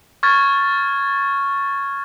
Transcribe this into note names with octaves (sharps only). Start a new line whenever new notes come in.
C#6 F6 G#6 A6